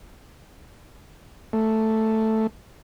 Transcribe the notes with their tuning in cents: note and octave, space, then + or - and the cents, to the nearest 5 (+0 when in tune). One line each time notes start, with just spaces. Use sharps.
A3 +0